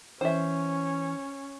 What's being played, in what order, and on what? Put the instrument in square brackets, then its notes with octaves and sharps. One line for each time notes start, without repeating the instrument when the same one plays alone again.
[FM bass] E3 [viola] C#4 [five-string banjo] C5 E5